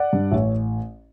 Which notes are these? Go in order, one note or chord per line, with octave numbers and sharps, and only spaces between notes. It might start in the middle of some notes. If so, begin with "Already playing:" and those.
Already playing: D5 F#5
G2
A1 C#5 E5